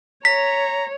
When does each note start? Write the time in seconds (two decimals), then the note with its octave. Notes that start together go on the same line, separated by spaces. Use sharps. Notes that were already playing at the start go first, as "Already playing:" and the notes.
0.25 C#5 A#5 B6